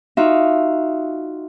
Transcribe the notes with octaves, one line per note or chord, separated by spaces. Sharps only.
D#4 F4 F#4 E5